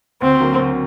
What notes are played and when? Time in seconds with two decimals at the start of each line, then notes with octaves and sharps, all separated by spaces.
0.22 D2 C4
0.40 D3 F#3 A#3
0.59 D2